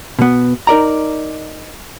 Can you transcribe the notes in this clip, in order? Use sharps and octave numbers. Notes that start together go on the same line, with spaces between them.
B2 B3
D#4 A#4 D5 A#5